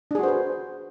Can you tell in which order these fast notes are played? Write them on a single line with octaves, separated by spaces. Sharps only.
D4 G#4 F#4 C5 B4